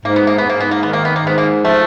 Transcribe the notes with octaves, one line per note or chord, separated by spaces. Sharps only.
G#2 A#3
B3
A#3
B3
G#2
A#3
B3
A#3
D#3 B3
A#3
B3
A#3
G#2 B3
A#3
F3 A3